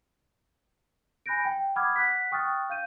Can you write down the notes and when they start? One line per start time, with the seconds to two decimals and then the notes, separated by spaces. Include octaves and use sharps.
1.26 G#5 B5 F#6 G6 A#6 D7
1.45 G5
1.76 F#5 B5 D6 D#6 F6 G#6
1.96 F#5 F#6 B6
2.31 G5 C#6 D#6 F6 F#6 A6
2.70 F5 G6 D#7